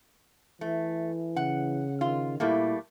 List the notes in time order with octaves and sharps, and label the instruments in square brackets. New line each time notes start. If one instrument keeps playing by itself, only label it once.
[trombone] E3 [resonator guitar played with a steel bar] A3
[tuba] C#3 [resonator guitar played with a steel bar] F#5
[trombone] D#3 [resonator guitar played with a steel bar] F4
[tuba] A#2 [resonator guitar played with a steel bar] G3 A3 A#3 [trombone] E4